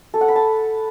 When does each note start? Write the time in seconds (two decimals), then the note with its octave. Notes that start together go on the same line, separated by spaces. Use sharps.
0.14 A4
0.21 F#5
0.28 B5
0.36 A5